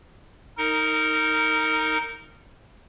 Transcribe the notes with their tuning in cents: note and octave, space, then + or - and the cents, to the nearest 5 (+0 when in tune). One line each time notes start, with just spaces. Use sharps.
D#4 +10 A#4 -20